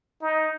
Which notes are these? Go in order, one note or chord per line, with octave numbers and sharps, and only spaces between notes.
D#4